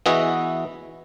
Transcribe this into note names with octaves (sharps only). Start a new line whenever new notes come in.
E3 B3 F#4 G#4 D#5 E5